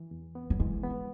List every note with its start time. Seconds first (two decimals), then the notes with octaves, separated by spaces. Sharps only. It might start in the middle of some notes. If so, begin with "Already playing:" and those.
Already playing: E3
0.11 E2
0.35 B3
0.50 F#3
0.60 E3 G#3
0.84 B3